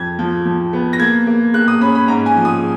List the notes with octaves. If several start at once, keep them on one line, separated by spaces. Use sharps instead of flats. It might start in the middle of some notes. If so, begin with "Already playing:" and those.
Already playing: F2 G#6
F3
F3
B3
A#6
A#3 G#6
A#3
A#3 F#6
D#6
C#4 B5
B5
G#2 A#5
G#5
F3
D#6